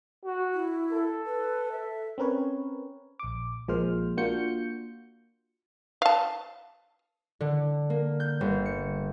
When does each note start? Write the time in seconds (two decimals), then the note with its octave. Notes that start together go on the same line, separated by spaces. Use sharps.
0.25 F#4
0.54 E4
0.92 A4
1.26 B4
1.72 E5
2.18 C4 C#4 A#4 B4 C#5
3.19 A#1 D6
3.68 A#1 F3 G#3 A#3 C5 F6
4.17 A#3 D4 F4 F#4 G6 C#7
6.02 F5 A5
7.40 D3
7.90 A#3
8.20 G6
8.41 G1
8.66 C#7